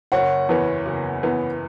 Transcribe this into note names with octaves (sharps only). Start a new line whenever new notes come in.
F#1 C#5 F#5
E2 E3 B3
F#1
E2 E3 B3